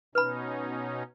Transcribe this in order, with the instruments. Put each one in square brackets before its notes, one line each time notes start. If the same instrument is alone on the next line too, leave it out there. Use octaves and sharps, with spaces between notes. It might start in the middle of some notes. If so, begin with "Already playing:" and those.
[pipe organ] B2 C#4 D#4 [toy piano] B4 B5